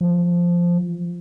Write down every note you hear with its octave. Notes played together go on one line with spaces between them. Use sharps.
F3